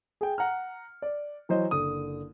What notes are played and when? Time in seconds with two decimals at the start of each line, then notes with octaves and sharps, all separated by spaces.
0.21 G#4 G5
0.38 F#5 A#5 F6
1.02 D5
1.49 E3 F#3 C5 D#5
1.71 F#1 D3 D#6